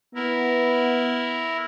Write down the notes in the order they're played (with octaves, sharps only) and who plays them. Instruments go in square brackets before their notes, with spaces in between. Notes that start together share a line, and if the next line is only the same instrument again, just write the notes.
[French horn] B3 [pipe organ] E4 A#4